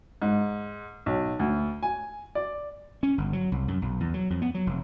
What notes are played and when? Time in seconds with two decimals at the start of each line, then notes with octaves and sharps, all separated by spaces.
0.22 G#2
1.06 B1
1.39 D2
1.83 G#5
2.35 D5
3.03 C#4
3.18 G1
3.33 F#3
3.52 C2
3.68 F#2
3.82 B1
4.00 E2
4.14 F#3
4.30 F2
4.42 B3
4.55 F#3
4.67 F1